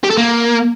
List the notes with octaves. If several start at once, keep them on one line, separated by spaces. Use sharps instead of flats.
G4
A4
A#3